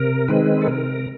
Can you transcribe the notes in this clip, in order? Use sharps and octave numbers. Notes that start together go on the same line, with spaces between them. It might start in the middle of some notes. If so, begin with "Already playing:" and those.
Already playing: C3 A#4
D#3 G#3 C4 B4
A4
C3 A#4